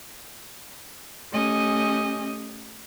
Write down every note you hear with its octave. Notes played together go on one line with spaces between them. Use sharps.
A3 C#4 G4 D#5 G#5